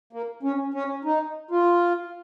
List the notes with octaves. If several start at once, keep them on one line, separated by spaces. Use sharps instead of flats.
A#3
C#4
C#4
D#4
F4